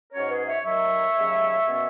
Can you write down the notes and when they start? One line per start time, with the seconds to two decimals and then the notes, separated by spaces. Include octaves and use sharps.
0.13 G#2 F#3 C#4 A#4 C#5
0.31 G#4 B4
0.47 C#5 E5
0.64 D#2 D#3 F#3 C#5 E5
1.16 D#2 C#3 F#3
1.67 B2 A#3 C#4